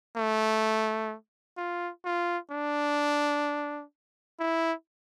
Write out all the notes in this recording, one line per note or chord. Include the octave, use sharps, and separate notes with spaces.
A3
F4
F4
D4
E4